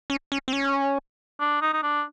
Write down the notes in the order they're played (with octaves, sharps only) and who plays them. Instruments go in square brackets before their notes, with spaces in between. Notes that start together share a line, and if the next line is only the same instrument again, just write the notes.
[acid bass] C#4
C#4
C4
C#4
[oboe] D4
D#4
D#4
D4